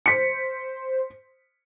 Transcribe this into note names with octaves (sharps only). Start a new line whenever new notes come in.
C5 B6 C#7